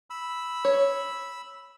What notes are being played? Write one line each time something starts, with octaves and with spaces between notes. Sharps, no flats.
B5 E6
C#5